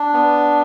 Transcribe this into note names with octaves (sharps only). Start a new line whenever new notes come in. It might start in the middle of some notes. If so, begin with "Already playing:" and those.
Already playing: D4
B3